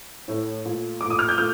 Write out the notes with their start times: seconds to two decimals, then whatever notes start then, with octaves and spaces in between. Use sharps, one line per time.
0.28 A2 A3
0.65 A#2 A3
1.01 A#2 A3 D6
1.10 D#6
1.19 F6
1.29 G6
1.38 A#2 A3 F6